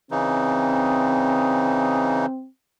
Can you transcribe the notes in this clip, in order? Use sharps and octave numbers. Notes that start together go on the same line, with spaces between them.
C#3 E3 C4 D#4